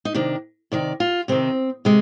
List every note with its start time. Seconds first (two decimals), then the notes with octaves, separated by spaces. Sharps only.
0.05 D#4
0.14 C3 D#3 D4
0.72 C3 D#3 D5
1.00 F4
1.28 C3 D#3 C4
1.85 C3 G#3